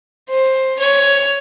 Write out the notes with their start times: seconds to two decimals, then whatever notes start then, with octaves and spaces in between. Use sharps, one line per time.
0.30 C5
0.79 C#5